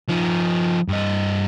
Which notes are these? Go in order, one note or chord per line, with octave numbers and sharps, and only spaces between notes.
F3 D#4
G2 D#5